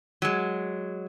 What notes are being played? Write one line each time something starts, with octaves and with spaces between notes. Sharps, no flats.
F#3 G#3